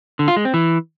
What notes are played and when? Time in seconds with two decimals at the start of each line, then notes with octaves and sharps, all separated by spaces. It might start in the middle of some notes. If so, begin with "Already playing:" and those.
0.19 D3
0.28 F4
0.36 G#3
0.45 C4
0.54 E3